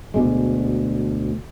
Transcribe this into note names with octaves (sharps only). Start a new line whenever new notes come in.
D2 B2 G#3